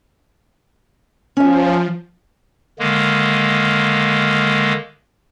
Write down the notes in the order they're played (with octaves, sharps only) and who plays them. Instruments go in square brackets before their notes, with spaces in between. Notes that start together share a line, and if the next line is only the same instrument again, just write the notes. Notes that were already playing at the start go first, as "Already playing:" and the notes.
[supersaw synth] F3 [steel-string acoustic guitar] C#4 E5
[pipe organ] D3 D#3 G#3 A#3